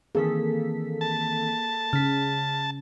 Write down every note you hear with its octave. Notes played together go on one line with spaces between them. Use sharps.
D#3 E3 A#3 C4 G#4 A4 B6
A5
C#3 F6 B6